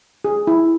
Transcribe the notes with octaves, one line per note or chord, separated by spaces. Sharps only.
G#4
E4